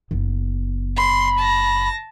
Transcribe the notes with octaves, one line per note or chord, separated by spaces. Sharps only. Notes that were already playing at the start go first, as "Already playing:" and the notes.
F#1 B3
B5 C6
A5 A#6